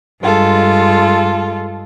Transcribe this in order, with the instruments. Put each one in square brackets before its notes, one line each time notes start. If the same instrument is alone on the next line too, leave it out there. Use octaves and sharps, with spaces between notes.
[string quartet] G2 G#3 F4 A4